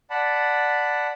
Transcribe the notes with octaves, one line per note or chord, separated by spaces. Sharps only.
D5 F#5 A5 B5